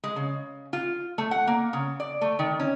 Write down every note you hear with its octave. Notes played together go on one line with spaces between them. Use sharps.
G#3
C#3
F4
A3
F#5
A#3
C#3
D5
A3
D#3
C#4